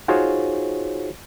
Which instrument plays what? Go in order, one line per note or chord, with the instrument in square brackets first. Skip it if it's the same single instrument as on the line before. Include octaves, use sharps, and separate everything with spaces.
[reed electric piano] D#4 F4 F#4 G#4 C5 C#5